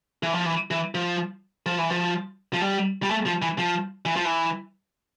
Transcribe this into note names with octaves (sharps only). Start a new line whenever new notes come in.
E3
F3
E3
E3
F3
F3
E3
F3
F3
G3
G3
A3
F3
E3
F3
E3
F3
E3